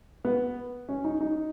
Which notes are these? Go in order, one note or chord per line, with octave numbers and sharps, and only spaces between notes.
B3
C#4
D#4
D#4